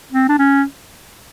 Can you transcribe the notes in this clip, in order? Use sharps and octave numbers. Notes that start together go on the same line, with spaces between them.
C4
D4
C#4